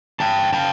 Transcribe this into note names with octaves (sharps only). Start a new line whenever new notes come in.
E2 G5 A5
C#3 G5 A5